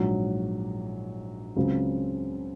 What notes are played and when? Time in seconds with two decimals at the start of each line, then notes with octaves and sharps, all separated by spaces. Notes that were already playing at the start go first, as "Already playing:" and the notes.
Already playing: A#1 G#2 F#3
1.56 C#2 C#3 F#3 C4